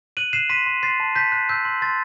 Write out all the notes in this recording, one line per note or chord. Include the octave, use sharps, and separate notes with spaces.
F#6 D#7 F#7
F#6 C7 E7
C6 B6 D#7
C6
C6 A6 C7
A5
A5 G6 B6
F#6
E6 G6
C6
C6 A6